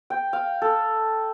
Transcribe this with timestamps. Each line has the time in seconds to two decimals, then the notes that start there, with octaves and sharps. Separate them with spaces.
0.10 G5
0.33 F5
0.62 A4